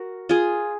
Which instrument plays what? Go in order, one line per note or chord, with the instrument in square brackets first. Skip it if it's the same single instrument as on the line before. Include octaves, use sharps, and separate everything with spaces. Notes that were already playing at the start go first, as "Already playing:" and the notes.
Already playing: [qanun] F#4 A#4
F4 G#4